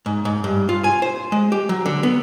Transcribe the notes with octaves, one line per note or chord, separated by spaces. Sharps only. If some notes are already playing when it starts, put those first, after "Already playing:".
G#2
G#2
G2
F4
G#5
C5
G#3
G4
F#3
D3
B3